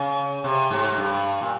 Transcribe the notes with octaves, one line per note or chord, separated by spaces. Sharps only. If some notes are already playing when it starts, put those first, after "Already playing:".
Already playing: C#3
C3
G#2
G2
A#2